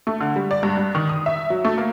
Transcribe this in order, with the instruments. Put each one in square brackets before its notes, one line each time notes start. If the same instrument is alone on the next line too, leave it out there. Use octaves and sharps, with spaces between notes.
[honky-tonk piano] A3
D3
G3
D5
G2
G2
D#3
D#6
E5
F#3
A3
A#3